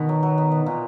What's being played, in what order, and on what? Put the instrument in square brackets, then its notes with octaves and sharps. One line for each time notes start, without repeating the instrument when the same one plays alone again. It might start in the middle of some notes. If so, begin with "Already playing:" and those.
Already playing: [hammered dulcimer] B2 B3 [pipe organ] D#3
[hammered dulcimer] F#3
F#3
B3
B2
A#2